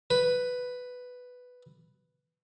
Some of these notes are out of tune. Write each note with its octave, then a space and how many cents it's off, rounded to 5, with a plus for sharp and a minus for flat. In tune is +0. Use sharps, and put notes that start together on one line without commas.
B4 +5